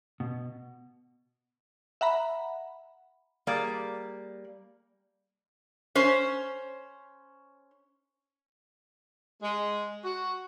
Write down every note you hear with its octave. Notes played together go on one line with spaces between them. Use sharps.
B2
E5 F#5 A#5 B5
G3 A#3 G#4 D5
C#4 C5
G#3
F#4